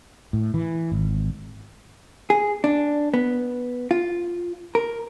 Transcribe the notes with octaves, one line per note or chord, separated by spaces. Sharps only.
A2
E3
G#1
G#4
D4
B3
F4
A#4